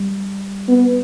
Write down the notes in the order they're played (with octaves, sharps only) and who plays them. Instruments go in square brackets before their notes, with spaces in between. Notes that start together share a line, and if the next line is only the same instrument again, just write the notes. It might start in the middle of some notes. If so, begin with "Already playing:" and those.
Already playing: [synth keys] G3
[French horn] B3